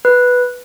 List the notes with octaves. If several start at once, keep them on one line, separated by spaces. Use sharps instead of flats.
B4